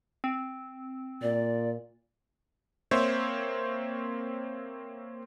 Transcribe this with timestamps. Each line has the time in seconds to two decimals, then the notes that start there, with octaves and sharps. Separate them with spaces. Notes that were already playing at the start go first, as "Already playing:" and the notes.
0.24 C4
1.22 A#2 D5
2.91 A#3 C4 C5 C#5 E5